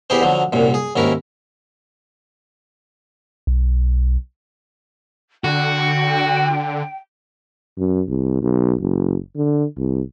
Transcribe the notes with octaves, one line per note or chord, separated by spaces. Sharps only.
E2 E3 E4 G4 G#4 C5
D3 F3 F#3
C2 F#2 A#2
G#4
D#2 G#2 C#4 E4 A#4
B1
D3 F#4 G5
F#2
C2
B1
F#1
D3
C2